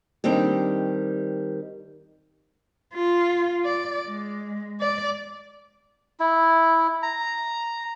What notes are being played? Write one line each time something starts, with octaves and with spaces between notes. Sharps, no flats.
D#3 G3 C4 D4 G4
F4
D5
G#3
D5
E4
A#5